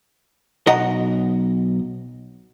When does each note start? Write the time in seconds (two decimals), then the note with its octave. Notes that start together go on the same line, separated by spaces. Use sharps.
0.67 B1 D#5 F#5 A#5